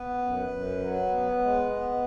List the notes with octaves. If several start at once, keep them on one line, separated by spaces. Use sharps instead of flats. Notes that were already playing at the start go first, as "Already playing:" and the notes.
Already playing: B3 B4
F#2
F#2
F#3
B3
G#3
B3